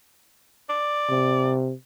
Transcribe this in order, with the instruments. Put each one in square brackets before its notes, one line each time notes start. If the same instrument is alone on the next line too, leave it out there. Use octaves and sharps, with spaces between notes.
[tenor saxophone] D5
[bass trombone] C3